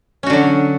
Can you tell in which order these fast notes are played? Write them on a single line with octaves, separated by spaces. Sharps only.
C#4 F#4 D3 F#3